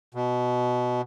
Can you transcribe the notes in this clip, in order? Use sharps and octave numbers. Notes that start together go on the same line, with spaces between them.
B2